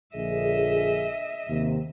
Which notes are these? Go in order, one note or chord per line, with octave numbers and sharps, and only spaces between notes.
A#1 D3 G#4 D#5 E5
D#2 C3